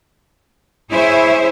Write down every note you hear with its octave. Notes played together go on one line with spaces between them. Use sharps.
E4 G#4 C5 C#5 E5